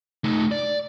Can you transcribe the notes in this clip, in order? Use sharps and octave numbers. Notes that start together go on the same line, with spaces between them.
A3 D#4
D5